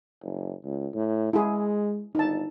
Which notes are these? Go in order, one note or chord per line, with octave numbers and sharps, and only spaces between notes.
F#1
C#2
A2
G#3 E4 G#4
G1 D#4 A5